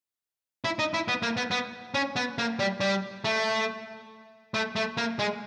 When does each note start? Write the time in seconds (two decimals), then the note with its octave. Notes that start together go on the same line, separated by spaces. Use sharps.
0.64 E4
0.79 D#4
0.94 E4
1.08 B3
1.23 A#3
1.37 B3
1.51 B3
1.94 C#4
2.16 B3
2.38 A#3
2.59 G3
2.80 G3
3.24 A3
4.54 A3
4.76 A3
4.97 A#3
5.19 G#3